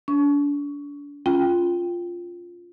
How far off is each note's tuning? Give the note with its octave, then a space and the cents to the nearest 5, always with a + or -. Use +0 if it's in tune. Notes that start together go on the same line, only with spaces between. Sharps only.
D4 -35 C#6 +20
C#4 +0 F4 +0 G5 +0